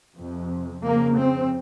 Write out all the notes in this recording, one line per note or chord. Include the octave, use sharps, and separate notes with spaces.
F2 C3
F2 C#3 A#3
C4